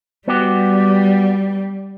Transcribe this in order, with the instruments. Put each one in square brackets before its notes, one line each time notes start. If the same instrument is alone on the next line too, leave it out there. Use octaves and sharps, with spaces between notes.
[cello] G3 [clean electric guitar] B3 F#4 G4